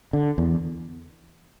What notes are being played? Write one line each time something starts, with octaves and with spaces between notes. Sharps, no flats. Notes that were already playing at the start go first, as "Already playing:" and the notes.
D3
E2